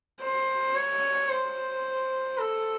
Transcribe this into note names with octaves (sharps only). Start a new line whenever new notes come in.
C5
C#5
C5
A4